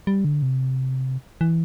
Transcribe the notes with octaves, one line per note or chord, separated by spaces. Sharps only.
G3
D3
C3
E3